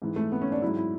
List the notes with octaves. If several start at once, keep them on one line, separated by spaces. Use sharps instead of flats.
G#2 E3
A3
B3
C#4
D4
G#2 F#3 E4
E4